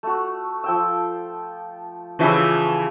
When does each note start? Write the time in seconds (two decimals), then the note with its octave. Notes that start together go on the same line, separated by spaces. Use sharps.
0.03 A3 F#4
0.64 F3 G5 E6
2.19 C#3 E3 F3 E4 G4 E6